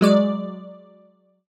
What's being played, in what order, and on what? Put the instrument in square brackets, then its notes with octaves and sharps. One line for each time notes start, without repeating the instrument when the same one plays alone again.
[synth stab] F#3 G#3 D5